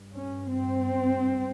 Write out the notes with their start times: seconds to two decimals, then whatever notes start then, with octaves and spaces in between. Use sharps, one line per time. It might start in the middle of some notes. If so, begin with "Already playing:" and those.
Already playing: G2
0.15 C#4
0.50 C4